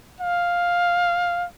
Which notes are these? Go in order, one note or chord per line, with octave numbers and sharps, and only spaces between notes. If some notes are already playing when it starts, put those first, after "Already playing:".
F5